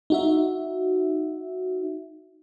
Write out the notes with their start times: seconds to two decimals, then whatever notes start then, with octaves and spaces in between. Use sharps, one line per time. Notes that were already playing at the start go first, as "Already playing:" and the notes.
0.10 D#4 F#4 E5